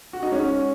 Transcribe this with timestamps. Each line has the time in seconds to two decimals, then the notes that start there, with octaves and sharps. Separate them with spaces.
0.13 F#4
0.23 D#4
0.32 G#3 C#4